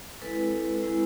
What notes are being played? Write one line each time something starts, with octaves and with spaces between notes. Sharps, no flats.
G#3 C4 E4 A4 B4
G#3 C4 E4